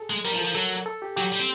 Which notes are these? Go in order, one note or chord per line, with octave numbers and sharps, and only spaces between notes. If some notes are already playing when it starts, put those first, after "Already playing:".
Already playing: G#4 A4
G#3
G3 A#4
F3
A4
F3
F#3 A4
A4
G4
F#3 G4
G3
C4